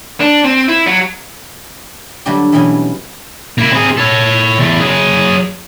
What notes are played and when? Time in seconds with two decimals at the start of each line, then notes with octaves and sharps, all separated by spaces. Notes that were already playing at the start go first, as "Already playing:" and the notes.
0.20 D4
0.45 C4
0.68 E4
0.87 F#3
2.25 D3 F#3 G3 A3 F#4 G4
2.52 B2 E3 F#3 G3 B3 C#4
3.58 A#3 E4
3.72 C4 G#4
3.97 A4 C#5
4.58 E2 A3
4.81 F#3 G#4